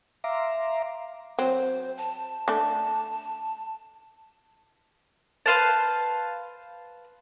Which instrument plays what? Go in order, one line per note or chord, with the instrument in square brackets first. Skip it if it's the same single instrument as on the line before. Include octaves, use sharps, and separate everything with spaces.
[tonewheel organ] E5 F5 A#5 C6 D6
[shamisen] F#3 C4 [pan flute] C5
[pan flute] A5
[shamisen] A3 D4
[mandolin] B4 C5 F5 A5